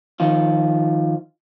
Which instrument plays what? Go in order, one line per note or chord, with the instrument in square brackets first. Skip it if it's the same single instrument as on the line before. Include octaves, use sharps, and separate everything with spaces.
[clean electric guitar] D#3 F3 F4